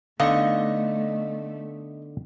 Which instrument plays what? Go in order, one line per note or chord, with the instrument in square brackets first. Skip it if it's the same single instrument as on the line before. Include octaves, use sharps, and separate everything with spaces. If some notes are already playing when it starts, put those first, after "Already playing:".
[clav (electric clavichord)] D3 B3 D#4 [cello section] A3 [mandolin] D#5 C#6 [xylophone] F5